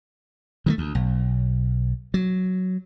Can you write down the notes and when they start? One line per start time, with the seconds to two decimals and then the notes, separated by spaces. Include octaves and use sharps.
0.66 D#3 F3 A3
0.78 D2
0.95 B1
2.14 F#3